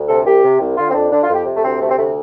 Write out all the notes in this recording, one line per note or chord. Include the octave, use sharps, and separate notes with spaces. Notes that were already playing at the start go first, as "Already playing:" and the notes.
Already playing: D2
C3 A4
C2 G4
C3
C2
D3 F4
C4
F2 D4
D3 D4
F4
F2
G4
C3
A3
D2 C4
C3 A3
C4
D2 A3
C4